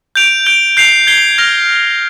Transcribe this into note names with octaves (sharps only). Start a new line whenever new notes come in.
G6 D7 F7
G6 D7 G7
G6 C7 F7
G#6 C7 G7
F6 A#6 F7